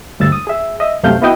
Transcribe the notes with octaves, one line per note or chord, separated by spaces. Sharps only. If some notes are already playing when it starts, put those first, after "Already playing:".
D2 G2 E6 A6
D#6
G#4 E5
D#5 E5
C2 F#2 C3 A3 F5 G6
B3 E4 F#4 B4 D#5 G5